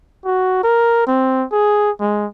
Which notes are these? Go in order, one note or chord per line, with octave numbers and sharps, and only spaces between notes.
F#4
A#4
C4
G#4
G#3